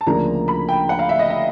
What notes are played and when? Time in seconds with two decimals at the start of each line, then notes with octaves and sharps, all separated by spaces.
0.01 A5
0.06 D2 C#3 F3 A#3 D4 A#5
0.48 B5
0.69 G5
0.89 F#5
0.99 F5
1.09 E5
1.19 D#5
1.30 E5